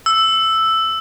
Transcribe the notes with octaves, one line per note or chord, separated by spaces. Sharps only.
E6